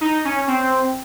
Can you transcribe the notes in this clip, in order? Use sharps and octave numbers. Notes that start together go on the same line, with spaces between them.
D#4
C#4
C4